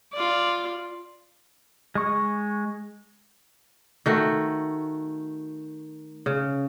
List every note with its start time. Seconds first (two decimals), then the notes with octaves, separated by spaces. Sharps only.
0.13 F4 D5
1.95 G#3 C#6
4.06 D#3 A3 F#4
6.26 C#3